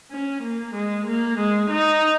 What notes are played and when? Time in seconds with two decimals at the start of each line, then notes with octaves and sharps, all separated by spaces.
0.11 C#4
0.43 A#3
0.75 G#3
1.06 A#3
1.39 G#3
1.70 D#4